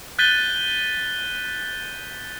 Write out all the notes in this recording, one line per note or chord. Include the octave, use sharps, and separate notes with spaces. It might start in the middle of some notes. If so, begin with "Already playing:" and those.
F#6 G6 A6 B6 D#7 G7